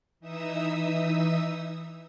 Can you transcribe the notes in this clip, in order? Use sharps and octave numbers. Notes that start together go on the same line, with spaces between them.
E3 D#4 E5 D#6 E6